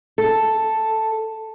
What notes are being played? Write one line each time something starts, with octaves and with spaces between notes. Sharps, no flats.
A4